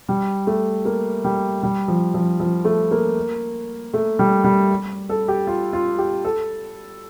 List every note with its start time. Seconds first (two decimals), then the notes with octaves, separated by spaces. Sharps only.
0.08 G3
0.47 A3
0.85 A#3
1.24 G3
1.63 G3
1.88 F3
2.14 F3
2.40 F3
2.65 A3
2.91 A#3
3.94 A3
4.19 G3
4.44 G3
5.09 A4
5.28 G4
5.47 F4
5.73 F4
5.98 G4
6.25 A4